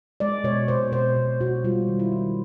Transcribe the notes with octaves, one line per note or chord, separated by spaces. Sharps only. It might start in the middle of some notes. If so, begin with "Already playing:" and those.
G#3 D5
B2 C#5
B2 C5
B2 C5
B2
B2 F#4
G3 F4
D#3
E4
D#3